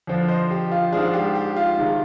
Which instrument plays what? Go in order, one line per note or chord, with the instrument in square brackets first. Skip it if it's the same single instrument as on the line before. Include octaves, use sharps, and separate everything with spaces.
[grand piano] F2 D3 F3
C5 D#5
G4
F4
G#2 F3 G#3 D4 F4 G#4
G4
G4
F4
C3 D#3 G#3